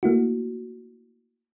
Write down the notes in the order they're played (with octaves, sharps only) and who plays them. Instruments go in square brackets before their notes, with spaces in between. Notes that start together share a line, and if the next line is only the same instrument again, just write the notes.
[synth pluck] A3 A#3 E4 F#4